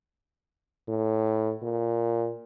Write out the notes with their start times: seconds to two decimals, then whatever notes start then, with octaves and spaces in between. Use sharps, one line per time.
0.88 A2
1.62 A#2